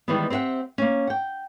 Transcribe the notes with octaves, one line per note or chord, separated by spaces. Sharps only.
D#3 E3 G3 G#3 B3
C4 G4 B4 E5 F#5
A#3 C#4
F#5 G5